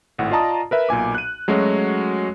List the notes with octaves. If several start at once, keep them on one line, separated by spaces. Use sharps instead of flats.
G#1 A2 F#5
F4 D5 D#5 A5 A#5 D#6
A#4 B4 E5
B1 A#2 G#5 D6
F#6 D#7
F#3 G#3 A3 C#4 F#4 C#5